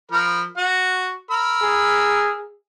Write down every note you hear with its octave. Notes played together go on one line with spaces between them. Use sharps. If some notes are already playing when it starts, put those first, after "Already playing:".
F3 A#4 B5
F#4 F#5
A#4 B5 E6
G#4